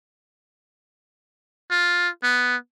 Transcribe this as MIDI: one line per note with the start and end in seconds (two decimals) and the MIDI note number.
1.71 2.09 65
2.23 2.56 59